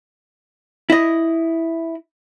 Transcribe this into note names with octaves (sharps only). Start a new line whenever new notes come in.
E4 D#5